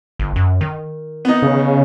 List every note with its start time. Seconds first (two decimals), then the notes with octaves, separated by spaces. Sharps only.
0.19 G1
0.36 F#2
0.61 D#3
1.25 B3 D#4
1.42 C#3